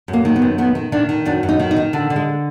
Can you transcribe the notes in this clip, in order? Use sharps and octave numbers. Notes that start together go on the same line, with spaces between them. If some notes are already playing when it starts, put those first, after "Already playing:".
F#2
A#3
D#3
B3
F#2
D#3 B3
D#3
D#3 D4
D#3
F#2 D4
F#2
D#4
D#3
D#4
D#3
D3
D3
G#3